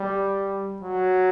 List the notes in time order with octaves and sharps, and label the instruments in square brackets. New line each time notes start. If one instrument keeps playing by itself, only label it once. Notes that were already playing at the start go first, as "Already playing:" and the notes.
Already playing: [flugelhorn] G3
F#3